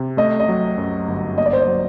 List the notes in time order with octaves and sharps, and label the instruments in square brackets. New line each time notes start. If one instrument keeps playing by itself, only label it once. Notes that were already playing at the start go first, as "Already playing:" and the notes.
Already playing: [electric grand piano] C3
[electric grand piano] A3 [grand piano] D#5
[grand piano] D#5
[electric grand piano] F#3
F#2
G1
[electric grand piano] A#3 [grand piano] D#5
[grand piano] D5
C5
D5
[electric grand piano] F#3